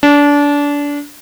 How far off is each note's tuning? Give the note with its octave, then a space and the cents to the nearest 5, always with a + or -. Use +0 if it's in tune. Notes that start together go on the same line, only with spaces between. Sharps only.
D4 -25